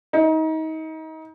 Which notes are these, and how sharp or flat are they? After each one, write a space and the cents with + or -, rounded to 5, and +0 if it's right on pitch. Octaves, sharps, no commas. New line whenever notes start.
D#4 +30